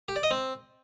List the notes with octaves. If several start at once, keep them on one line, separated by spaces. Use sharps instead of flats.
G4
D5
D#5
C4